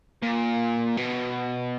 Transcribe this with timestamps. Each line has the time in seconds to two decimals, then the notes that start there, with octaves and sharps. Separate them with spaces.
0.23 A#2
0.97 B2